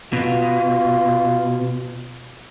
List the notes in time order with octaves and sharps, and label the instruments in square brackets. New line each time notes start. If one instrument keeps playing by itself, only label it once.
[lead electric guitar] B2 [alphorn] F4